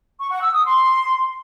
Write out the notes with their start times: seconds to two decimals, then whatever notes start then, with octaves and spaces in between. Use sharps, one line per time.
0.19 C#6
0.31 F#5
0.42 E6
0.53 D#6
0.65 C6